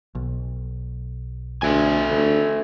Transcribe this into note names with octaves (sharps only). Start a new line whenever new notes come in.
B1
D2 A4 E5 G#5
D2